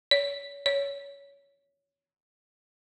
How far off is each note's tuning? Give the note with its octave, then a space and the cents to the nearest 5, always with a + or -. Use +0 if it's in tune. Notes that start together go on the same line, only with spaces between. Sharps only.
C#5 +35
C#5 +20